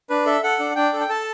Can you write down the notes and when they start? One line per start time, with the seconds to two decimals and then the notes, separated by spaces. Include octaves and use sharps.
0.10 D4 B4
0.26 A4 E5
0.43 A4 F#5
0.59 D4
0.76 D4 G5
0.93 A4
1.00 G5
1.09 A4 A5